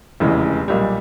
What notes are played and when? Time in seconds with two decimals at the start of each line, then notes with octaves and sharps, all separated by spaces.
0.20 F1 E2 C#3 E3 G#3
0.68 B1 A#2 G3